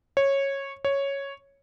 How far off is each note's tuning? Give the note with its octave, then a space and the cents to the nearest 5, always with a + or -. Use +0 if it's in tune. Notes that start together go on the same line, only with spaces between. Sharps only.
C#5 -10
C#5 +0